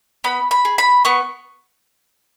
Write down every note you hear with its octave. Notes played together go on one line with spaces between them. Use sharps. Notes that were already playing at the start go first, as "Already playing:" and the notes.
B3 B5
B5
G#4
B5
B3 C#6